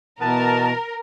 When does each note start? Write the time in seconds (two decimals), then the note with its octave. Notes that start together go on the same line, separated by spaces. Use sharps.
0.20 B2 E3 B3 A#4 A5